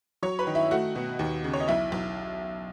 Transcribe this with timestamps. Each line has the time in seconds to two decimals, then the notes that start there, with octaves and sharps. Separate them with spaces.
0.22 F#3 C#5 C#6
0.39 B4 B5
0.47 D#3
0.55 E4 E5
0.71 A3 F#4 F#5
0.95 B2
1.19 D#2
1.44 C#3
1.53 C#5
1.60 D#5
1.68 B1 E4 E5
1.92 B1